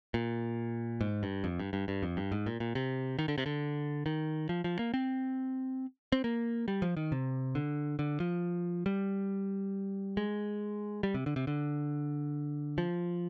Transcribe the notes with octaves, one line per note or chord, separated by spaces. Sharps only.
A#2
G#2
G2
F2
G2
G2
G2
F2
G2
G#2
A#2
A#2
C3
D#3
D3
C3
D3
D#3
F3
F3
A#3
C4
C4
A#3
G3
F3
D#3
C3
D3
D3
F3
G3
G#3
G3
C3
D3
C3
D3
F3